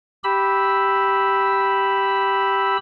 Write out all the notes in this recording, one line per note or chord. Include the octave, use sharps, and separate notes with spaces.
G4 B5 E6